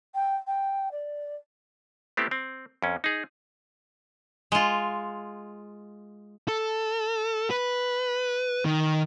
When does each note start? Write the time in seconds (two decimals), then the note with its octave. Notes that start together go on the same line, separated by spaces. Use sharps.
0.15 G5
0.47 G5
0.91 D5
2.17 A3 B3 C4 E4 G4
2.31 C4
2.82 F2 C#4
3.04 D#4 G#4
4.52 G#3 F4
6.48 A4
7.50 B4
8.65 D#3